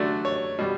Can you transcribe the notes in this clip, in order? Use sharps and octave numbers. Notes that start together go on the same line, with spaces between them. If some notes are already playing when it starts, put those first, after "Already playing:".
Already playing: D3 F#3 A3 D5
C#5
B2 G3